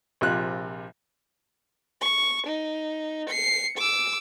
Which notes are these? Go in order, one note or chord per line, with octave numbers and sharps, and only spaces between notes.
A#1 C3 F4 F#6
C#6
D#4
C7 C#7
D6 E6